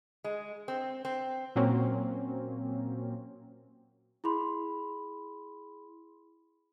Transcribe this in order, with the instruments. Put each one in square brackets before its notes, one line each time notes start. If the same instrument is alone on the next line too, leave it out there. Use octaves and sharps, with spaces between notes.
[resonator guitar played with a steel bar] G#3
C4
C4
[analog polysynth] A#2 F#3 A#3 C4 C#4
[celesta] E4 G#4 B5 C6